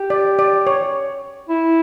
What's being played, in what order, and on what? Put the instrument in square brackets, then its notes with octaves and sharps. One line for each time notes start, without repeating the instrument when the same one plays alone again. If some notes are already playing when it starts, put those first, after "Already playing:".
Already playing: [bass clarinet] G4
[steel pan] D5
D5
C#5
[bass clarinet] E4